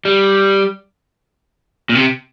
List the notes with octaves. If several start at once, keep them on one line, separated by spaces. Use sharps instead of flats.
G3
A#2
C3